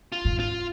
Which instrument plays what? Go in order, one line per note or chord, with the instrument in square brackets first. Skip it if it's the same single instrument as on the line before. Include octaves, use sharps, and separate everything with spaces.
[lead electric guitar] F4
[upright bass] G#2
[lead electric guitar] F4